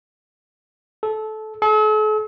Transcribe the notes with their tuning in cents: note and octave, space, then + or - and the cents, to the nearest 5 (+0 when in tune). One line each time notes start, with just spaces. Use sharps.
A4 -20
A4 -45